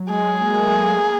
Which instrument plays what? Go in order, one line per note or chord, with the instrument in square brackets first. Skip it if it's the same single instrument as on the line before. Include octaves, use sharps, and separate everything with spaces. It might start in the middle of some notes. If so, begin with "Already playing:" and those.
Already playing: [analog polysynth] F#3
[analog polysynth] G#3 [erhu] G#4
[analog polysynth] A#3
A3
A#3